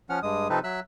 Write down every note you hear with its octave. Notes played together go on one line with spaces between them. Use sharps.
F3 C#4 F#5 F6
G2 G#3 D#6
C3 F3 C4 D#4 A4 B4
F#3 E5 E6 F#6